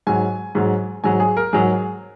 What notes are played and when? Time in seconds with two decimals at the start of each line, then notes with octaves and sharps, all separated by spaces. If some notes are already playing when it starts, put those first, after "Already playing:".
0.07 G#2 F#3 G#5
0.55 G#2 F#3
1.04 G#2 F#3 G#5
1.20 G#4
1.37 A#4
1.53 G#2 F#3 G#4